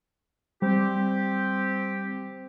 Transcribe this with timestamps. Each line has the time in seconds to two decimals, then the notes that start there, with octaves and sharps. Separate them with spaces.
0.62 G3 C4 G4